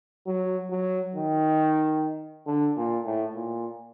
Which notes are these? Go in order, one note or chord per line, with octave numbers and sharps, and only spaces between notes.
F#3
F#3
D#3
D3
A#2
A2
A#2